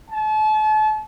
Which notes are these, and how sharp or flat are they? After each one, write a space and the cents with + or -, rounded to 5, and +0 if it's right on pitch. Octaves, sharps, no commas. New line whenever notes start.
A5 -35